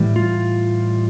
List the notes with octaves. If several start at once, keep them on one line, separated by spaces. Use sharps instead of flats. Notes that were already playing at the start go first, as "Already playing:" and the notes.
Already playing: A2 E3 G3
F4